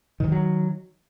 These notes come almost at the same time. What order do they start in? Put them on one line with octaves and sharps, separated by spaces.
D#3 E3 G3 F#3